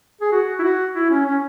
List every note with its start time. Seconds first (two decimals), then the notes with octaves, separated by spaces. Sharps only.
0.21 G#4
0.32 F#4
0.59 E4
0.63 F#4
0.95 E4
1.10 C#4
1.26 C#4